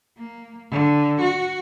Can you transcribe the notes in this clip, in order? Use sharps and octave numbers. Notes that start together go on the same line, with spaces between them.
A#3
D3
F#4